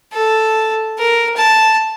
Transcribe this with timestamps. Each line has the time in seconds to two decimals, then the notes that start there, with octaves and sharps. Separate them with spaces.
0.13 A4
0.98 A#4
1.36 A5